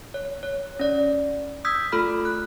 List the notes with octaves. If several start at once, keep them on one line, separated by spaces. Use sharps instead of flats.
C#5
C#5
C#4 D5
D#6 E6 G6 G#6 B6
A3 F4 A4 B5 F6
F#6